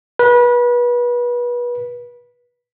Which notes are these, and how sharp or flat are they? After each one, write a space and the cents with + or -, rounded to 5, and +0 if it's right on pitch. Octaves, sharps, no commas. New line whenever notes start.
B4 -30